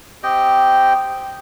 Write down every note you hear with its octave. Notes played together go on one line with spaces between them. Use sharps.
C4 G4 D#5 G5